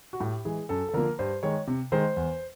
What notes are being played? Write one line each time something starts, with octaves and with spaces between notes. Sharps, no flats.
F#4
A2 G4
E3 G#3 G#4
F#2 A4
A4
D3 F3 A#3 A#4
G2 C5
D#3 G#3 C#5
C3
D#3 G#3 C5
E2